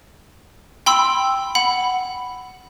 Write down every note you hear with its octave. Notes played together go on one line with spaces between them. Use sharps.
G5 B5 C6 E6
F#5 B5